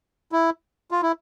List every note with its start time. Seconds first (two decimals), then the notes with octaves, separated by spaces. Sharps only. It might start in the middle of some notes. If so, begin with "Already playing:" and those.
0.32 E4
0.91 F4
1.02 E4